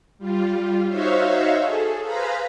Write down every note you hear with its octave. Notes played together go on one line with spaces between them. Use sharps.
G3 F4
D#4 F#4 C5 C#5 E5 F5
G#4 A4
G#4 B4 C5 F5 A#5 B5